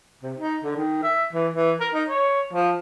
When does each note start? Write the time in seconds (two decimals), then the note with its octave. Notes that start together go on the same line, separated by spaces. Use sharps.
0.23 C3
0.38 D#4
0.63 D3
0.77 D#3
1.03 E5
1.33 E3
1.54 E3
1.80 A#4
1.93 D#4
2.09 C#5
2.53 F3